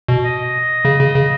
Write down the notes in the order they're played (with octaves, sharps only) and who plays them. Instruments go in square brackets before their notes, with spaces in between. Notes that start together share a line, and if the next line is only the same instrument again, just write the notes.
[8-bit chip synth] B2
[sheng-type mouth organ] D#5
[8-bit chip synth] C#3
C#3
C#3